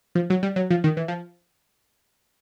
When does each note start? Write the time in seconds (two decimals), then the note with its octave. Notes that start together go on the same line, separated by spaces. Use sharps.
0.15 F3
0.30 F#3
0.43 G3
0.56 F#3
0.70 F3
0.84 D#3
0.97 E3
1.08 F3